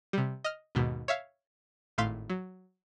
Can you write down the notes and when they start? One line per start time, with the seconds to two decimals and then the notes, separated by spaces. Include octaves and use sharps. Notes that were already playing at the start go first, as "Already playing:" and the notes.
0.13 C3 G3
0.44 D#5 F6
0.75 D#2 G#2 B2
1.08 C#5 E5 F5
1.98 G#1 A2 A3 F5 C6 B6
2.30 F#3